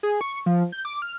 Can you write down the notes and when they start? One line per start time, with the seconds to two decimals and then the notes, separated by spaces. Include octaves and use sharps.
0.03 G#4
0.21 C#6
0.46 F3
0.72 G6
0.85 D6
1.02 F6